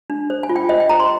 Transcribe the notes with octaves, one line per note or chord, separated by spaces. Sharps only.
D4
C5
G#5
F4
G5
C5 D#5
G5
C5 A#5
C6